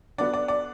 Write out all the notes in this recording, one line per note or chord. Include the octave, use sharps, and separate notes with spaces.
D3 B3 D4 D5
D5
D5